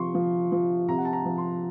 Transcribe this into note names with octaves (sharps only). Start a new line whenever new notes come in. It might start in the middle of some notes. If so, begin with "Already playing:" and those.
Already playing: C3 F3 C6 C#6
F3
F3
C3 A#5
F#5
A5
A#5
F3
C6